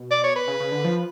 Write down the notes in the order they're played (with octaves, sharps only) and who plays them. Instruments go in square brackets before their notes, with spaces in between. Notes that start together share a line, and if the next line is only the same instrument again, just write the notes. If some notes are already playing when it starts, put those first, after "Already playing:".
Already playing: [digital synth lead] B2
[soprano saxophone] D5
C#5
B4
[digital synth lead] C#3
C#3
D3
F3